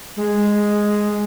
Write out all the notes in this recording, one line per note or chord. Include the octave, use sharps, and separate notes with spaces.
G#3